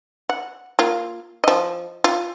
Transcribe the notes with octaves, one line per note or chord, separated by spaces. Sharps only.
F#5
A#3 F4
F3 D#5
F4